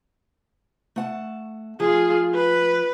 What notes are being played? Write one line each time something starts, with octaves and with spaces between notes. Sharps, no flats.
A3 F#5 A5
F3 F4 G#4
B4